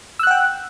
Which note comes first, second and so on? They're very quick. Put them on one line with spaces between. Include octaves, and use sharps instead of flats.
E6 F#6 F#5 G5